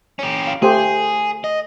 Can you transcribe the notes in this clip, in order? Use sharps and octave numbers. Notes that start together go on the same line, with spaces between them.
C#4 G4
F5
A3 G4 G#4 C5
D#5